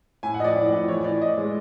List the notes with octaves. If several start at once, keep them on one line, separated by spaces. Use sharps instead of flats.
A2 G#5
F#5
F3 D#5
D5
A2
A2
E3 C#5
E3 D5
E3 D#5
G#3